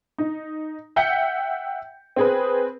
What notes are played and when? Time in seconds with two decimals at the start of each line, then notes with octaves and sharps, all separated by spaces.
0.18 D#4
0.96 E5 F#5 G5 G6 B6 C#7
2.16 C4 G#4 B4